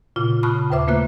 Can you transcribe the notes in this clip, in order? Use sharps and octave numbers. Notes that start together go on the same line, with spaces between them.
A#2 C#3 F4
A5 B5 C#6 D#6 F6 F#6
C#3
D#2 C#3 B4 C5 E5 D6
A3 A#3 F4 B4 F#6